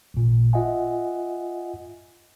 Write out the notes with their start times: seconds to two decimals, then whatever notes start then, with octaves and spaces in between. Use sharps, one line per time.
0.14 A1 A#2
0.53 F4 D#5 E5 F#5 G#5